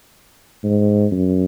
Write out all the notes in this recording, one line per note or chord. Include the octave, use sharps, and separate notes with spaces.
G#2
F#2